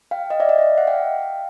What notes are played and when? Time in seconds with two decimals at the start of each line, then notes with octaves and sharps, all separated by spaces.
0.11 F5 G5
0.30 D#5 F5
0.40 D5 E5
0.49 D#5 F5
0.59 D5 E5
0.78 E5 F#5
0.87 F5 G5